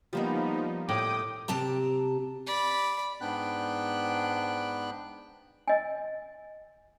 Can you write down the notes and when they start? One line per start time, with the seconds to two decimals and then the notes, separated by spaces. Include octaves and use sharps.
0.13 F3 G3 A#3 B3 D#4
0.89 A2 G5 D6 D#6
1.48 C3 C4 G4 A5 A#5
2.47 D5 B5
3.21 G#2 B3 D4 G5 B5 F#6
5.68 D#5 G#5